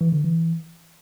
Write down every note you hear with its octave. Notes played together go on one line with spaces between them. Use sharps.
E3
D3
E3